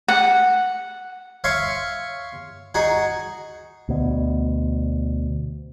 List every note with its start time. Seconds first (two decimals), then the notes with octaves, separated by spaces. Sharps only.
0.08 F#5
1.44 C#5 E5 F5 C6 C#6
2.75 D#4 F#4 G#4
3.89 D2 B2